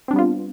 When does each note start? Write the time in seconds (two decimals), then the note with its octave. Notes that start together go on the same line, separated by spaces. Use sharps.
0.08 C4
0.11 D4
0.13 G3
0.16 B3
0.19 F4